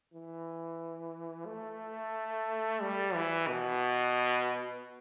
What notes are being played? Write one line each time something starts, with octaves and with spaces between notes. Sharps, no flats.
E3
A3
G3
E3
B2